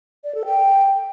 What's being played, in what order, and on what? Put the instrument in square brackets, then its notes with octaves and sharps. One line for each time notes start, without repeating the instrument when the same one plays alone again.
[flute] D5
A4
G5